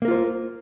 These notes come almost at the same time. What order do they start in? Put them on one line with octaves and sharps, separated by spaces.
A#3 A#4 F4 C5